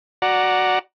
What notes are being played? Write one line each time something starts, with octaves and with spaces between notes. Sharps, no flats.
F#4 D5 F#5 A#5